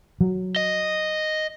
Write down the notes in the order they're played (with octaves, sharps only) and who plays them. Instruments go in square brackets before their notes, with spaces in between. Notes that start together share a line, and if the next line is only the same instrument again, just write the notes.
[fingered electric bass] F#3
[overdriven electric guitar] D#5